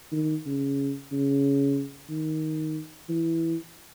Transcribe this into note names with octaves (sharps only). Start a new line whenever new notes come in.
D#3
C#3
C#3
D#3
E3